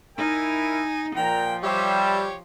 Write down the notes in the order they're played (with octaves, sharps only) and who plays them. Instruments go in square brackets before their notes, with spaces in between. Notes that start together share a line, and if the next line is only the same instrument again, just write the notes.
[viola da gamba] D#4 [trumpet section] E4 A#4 [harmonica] G#5
[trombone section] A#2 [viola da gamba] F3 [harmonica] G5 [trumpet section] A#5
[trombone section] G3 [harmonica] G4 C#5 [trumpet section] C5 E5